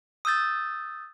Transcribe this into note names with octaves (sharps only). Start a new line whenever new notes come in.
D#6 E6 G6 A6